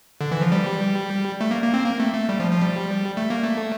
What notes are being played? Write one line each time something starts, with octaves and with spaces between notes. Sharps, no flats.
D3
E3
F3
G3
A3
A#3
A#3
C4
A#3
A3
A3
G3
F3
F3
G3
A3
A#3
A3